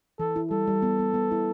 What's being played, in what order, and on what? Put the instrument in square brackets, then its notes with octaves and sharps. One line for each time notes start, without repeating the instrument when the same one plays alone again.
[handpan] E3 [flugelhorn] A4
[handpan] E4
[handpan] G3 [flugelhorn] A4
[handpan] G3
B3
B3
B3
E4